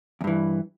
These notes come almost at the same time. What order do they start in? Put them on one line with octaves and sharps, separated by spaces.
E2 G2 E3